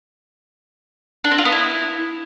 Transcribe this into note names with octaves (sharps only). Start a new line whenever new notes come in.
D4
C4
F4
B3
E4